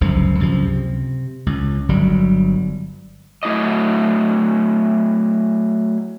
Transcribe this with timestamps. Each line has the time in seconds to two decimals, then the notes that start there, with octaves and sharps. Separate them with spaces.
0.01 G1 C#2 F#2 F3
0.39 C#2 F#2 C3 F3
0.64 C3
1.46 C#2
1.89 G1 F#3 G3
3.43 F#3 A3 E4 D5 D#5